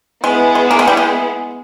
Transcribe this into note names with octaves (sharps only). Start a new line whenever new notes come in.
G#3 B3 E4 G#4
G#3
A#3
G#3
G3
G#3